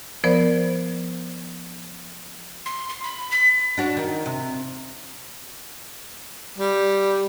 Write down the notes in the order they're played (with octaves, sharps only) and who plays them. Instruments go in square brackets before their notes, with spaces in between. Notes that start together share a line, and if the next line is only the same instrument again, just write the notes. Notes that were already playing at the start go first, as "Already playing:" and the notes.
[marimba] F3 B3 A#4 C5 D5
[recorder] C6
C6
B5
B6
[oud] D4 F#4 C#5
D#3
C3
[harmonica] G3